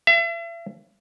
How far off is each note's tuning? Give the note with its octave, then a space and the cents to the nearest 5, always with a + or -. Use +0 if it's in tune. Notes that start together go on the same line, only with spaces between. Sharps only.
E5 +40